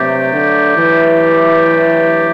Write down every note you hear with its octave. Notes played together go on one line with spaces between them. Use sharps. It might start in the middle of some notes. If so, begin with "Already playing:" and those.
Already playing: G2 C3 F#3 A3 D4 G4
D3
E3